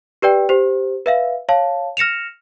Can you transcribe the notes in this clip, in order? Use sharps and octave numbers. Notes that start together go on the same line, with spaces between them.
G4 B4 D5 G5
G4 C5
B4 E5 F5
C#5 F5 A5
F6 A#6 C#7 E7 F7